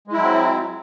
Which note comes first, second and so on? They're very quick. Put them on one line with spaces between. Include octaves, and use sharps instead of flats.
G#3 E4 F#3 C4